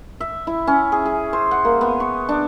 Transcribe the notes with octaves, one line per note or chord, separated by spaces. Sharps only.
E5
E4
C#4
G#4
G#4
C5
F#5
A#3
B3
C#6
D4